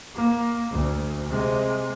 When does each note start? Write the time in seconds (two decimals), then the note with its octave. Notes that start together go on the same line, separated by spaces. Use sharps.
0.15 A#3
0.71 D2
1.29 C3 G#3